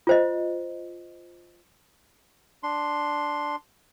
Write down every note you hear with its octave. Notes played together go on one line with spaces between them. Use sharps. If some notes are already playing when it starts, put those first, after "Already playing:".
F4 C5 D#5
D4 C6